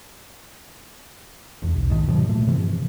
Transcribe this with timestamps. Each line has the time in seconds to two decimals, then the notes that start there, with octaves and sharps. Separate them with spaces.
1.62 F1 E2
1.73 E1 B1
1.90 G#2 D#3
2.07 B2 D#3 F3 F#3
2.29 A#2 A3
2.47 G2 C3 E3 F3